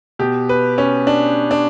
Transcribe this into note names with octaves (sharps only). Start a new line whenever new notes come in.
B2 G4
B4
C#4
D4
D4